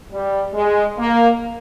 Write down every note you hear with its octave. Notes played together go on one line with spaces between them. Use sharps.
G3
G#3
A#3